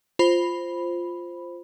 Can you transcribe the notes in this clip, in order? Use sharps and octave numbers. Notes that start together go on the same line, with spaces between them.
F4 C5 B5